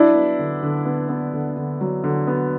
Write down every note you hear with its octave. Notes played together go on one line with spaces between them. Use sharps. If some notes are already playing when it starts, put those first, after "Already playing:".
Already playing: F#3 D4 E4
B3
D3
D3
B3
B3
D3
D3
F#3
D3
B3